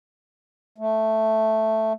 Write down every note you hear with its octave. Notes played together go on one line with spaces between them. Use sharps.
A3